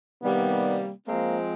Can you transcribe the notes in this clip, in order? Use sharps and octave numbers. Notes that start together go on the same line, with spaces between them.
C3 D#3 G3 A#3 B3
F3 G#3 A#3 C4